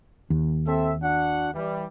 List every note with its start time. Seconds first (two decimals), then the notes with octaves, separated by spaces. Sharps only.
0.30 D#2
0.67 C4 A4 E5
1.02 D4 F#4 F#5
1.54 E3 G3